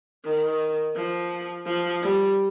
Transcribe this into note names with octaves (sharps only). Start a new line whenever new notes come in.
D#3
F3
F3
G3